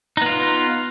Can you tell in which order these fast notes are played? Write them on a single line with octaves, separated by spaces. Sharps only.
D#4 B3 F4